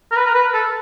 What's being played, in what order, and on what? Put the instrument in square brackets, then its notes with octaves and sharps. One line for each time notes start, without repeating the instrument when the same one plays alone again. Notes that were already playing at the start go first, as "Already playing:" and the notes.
[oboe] A#4
B4
A#4
B4
A4